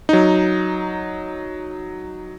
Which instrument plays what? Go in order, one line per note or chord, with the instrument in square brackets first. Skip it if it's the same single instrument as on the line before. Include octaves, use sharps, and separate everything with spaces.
[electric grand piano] F#3 D#4